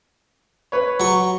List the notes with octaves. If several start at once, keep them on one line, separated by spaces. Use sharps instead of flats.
B4 C#5
F#3 C#6